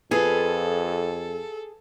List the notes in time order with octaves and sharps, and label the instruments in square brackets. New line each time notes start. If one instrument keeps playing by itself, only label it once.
[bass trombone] F2 [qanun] F4 B4 [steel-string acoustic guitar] G#4 [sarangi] A4